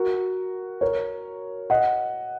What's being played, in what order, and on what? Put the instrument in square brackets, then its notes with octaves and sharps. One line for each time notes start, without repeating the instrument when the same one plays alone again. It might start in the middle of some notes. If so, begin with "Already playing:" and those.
Already playing: [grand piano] F#4 A#4
A#4 C#5
D#5 F#5